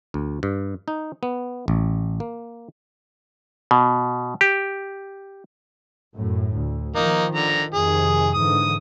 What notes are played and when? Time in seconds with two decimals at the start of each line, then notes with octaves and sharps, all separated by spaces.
0.14 D2
0.43 G2
0.88 D#4
1.23 B3
1.68 A1
2.20 A#3
3.71 B2
4.41 G4
6.17 F#2 A2
6.54 D2
6.96 D#3 F3 A#3 D#4
7.35 D3 A#5
7.74 F2 C3 D#3 G#4
8.34 G#2 D3 E3 D#6